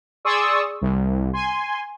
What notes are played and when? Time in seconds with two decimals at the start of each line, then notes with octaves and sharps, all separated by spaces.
0.25 G#4 D5 C6 C#6 D#6 E6
0.81 C2
1.33 G#5 C6